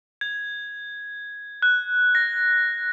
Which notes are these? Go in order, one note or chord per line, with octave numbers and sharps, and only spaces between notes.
G#6
F#6
A#6